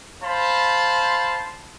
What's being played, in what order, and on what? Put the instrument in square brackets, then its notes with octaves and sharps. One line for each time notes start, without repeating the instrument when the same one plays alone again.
[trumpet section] C5 F5 A5 B5 C6